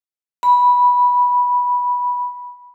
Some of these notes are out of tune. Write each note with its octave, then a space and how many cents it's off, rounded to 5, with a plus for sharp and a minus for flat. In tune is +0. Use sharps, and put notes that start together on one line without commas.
B5 -10